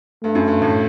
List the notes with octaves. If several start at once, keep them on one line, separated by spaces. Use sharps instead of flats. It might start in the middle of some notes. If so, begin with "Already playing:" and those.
G2 A3
F#2
G2
A2